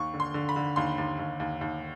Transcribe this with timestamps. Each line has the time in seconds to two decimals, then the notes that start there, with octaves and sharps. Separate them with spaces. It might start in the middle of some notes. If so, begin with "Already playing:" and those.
Already playing: D#2 C#6
0.14 D3
0.20 C6
0.34 D3
0.49 B5
0.56 D3
0.76 D#2 C6
0.98 D#2
1.19 D#2
1.40 D#2
1.61 D#2